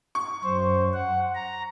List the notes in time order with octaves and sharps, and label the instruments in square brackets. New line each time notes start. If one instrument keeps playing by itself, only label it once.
[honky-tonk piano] C#6
[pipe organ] F#2 C5
F#5
A#5